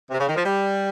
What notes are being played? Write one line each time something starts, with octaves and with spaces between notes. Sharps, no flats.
C3
C#3
D#3
F3
G3